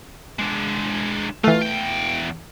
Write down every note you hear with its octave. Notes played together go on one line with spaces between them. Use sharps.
G#3 D4
E3 A3 F4
E2 G5